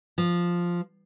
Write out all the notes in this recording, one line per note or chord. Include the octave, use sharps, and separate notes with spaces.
F3